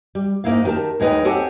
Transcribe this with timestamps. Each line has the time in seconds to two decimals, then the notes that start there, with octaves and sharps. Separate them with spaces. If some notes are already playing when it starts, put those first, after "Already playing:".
0.15 G3
0.44 G#2 A#3 D#4 E4 F5
0.64 D#3 C#4 G4 A#4 A5
1.00 D#2 G#3 D#4 B4 G5
1.25 C4 G4 A4 C#5 F#5 G#5